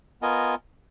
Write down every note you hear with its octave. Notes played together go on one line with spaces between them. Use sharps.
B3 F4 A#4 D#5 G#5